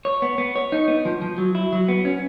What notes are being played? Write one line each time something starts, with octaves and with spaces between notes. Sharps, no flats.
C#5
B3
B3
C#5
D#4
B3
F3
F3
F#3
E4
F#3
B3
C#4